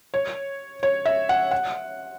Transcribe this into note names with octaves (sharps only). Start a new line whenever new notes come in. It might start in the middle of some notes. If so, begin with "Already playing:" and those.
C#5
C#5
E5
F#5
F#5